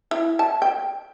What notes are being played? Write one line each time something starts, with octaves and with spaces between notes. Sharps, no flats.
E4
A5
G5